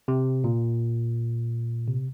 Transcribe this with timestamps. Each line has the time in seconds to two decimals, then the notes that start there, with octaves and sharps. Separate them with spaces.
0.08 C3
0.44 A#2
1.88 C3